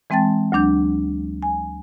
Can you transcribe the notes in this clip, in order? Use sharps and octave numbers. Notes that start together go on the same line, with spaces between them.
E3 G#3 C4 G5 A5 A6
D2 F#3 D4 G6
G#5